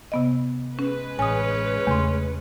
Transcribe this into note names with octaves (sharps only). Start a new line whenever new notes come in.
C3 B3 D#5
G#3 C#4 B4
A1 C#4 G#5 D#6
E2 C#3 A3 C6